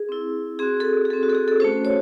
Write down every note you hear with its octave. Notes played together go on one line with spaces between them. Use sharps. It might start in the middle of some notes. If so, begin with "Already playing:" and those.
Already playing: G#4
C4 E4
C4 F#4 G#4
A4
G#4
G#4
C4 F#4 A4
F#4
A4
G#4
A4
A3 C#4 F#4 C5
C#5